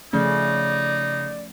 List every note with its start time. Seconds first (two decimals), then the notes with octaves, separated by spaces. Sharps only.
0.13 C#3 F3 A3 C#4 D#4 D5